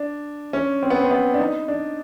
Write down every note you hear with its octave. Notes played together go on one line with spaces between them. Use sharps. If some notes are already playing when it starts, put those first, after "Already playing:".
Already playing: D4
C#4
C4
B3
C4
B3
D4
D#4
D4